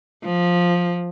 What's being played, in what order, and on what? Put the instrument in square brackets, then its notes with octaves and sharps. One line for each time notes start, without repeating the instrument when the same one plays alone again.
[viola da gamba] F3